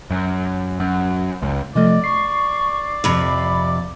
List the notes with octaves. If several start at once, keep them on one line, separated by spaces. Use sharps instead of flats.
F#2
F#2
C#2
C3 F3 A3 D5 D#5
C#6 C7
F2 C3 B5